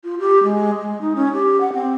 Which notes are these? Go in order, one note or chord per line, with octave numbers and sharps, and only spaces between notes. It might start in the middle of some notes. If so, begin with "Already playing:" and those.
F4
G4
G#3
G#3
D#4
C#4
G4
F#5
C4